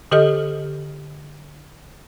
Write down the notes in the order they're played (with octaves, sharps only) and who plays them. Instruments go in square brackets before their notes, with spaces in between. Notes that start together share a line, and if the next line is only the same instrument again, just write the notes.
[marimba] D3 G4 A4 D#5 F6